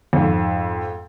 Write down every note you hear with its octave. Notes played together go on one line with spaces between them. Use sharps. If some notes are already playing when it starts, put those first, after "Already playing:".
F2 G#2